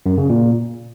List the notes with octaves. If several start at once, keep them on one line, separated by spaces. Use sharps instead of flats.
F#2
C#3
A#2